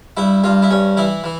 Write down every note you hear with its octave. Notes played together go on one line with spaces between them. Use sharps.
G2 E4
G2 F4
E4
G2 C#4
E3 E4
E3